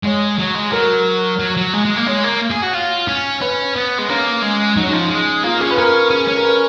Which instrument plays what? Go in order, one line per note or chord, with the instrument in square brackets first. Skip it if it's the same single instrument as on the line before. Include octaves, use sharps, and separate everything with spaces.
[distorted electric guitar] G#3 [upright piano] C#5
[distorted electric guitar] F#3
G#3
[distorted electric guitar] F#3 [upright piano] A#4
[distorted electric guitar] F#3
F#3
G#3
G#3
A#3
[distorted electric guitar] G#3 [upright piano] C#5
[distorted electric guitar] A#3
G#4
F#4
F4
C#4
[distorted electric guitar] C#4 [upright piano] B4
[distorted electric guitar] B3
G#3
[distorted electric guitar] A#3 [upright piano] C#4
[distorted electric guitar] G#3
[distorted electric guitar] F#3 [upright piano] D#4
[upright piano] C#4
[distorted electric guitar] F3 [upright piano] D#4
[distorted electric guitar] G#3
[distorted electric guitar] A#3 [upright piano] F4
[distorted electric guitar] C#4 [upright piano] G#4
[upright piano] B4
[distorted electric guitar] C#4 [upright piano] A#4
[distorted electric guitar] C#4
C#4
[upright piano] A#4
B4